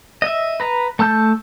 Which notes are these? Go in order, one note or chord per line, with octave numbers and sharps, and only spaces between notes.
D#5 E5
B4 A#5
A3 A5 E6 G6